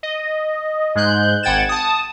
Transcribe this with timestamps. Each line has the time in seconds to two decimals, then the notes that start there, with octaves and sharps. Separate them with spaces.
0.03 D#5
0.95 G#2 G#3 F#6 G6
1.43 G#1 F#5 G5 G#6 A6 E7
1.69 A5 D#6